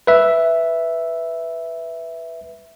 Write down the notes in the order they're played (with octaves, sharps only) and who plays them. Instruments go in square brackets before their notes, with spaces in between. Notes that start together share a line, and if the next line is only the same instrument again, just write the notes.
[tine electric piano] B4 E5